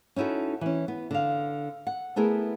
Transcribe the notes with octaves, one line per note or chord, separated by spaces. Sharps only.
C#4 D#4 E4 F#4 A4
E3 C#4
B3
D3 F5
F#5
A3 B3 E4 G#4 A#4